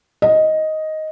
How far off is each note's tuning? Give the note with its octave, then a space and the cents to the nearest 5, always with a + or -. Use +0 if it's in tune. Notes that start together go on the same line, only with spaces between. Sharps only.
D#5 +5